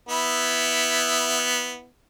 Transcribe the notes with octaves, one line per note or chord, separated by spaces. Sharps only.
B3 E4